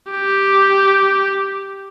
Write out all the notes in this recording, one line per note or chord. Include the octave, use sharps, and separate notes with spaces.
G4